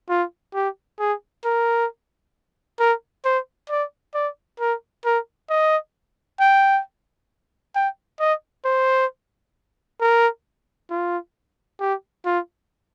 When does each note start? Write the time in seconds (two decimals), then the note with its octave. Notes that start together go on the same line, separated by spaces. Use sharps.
0.10 F4
0.55 G4
1.00 G#4
1.45 A#4
2.80 A#4
3.25 C5
3.70 D5
4.14 D5
4.60 A#4
5.05 A#4
5.50 D#5
6.40 G5
7.75 G5
8.20 D#5
8.65 C5
10.00 A#4
10.91 F4
11.80 G4
12.25 F4